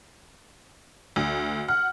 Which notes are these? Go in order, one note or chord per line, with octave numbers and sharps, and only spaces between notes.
D2
F#5 F6